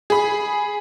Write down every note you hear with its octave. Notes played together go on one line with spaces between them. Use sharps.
G#4 B5